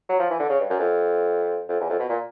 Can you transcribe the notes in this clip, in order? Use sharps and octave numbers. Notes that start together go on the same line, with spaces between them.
F#3
F3
E3
D3
C#3
G2
F#2
F2
F2
E2
F2
B2
A#2